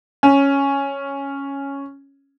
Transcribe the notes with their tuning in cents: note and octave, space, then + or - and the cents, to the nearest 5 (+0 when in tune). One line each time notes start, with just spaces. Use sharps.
C#4 +0